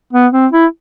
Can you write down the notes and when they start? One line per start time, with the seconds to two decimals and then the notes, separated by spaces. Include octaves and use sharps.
0.13 B3
0.33 C4
0.52 E4